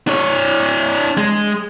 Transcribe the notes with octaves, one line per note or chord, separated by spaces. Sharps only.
D4 C#5
G#3